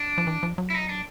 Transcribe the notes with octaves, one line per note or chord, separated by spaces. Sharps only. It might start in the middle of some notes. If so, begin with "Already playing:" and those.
Already playing: D4
F3
E3
F3
F#3
E4
D#4
D4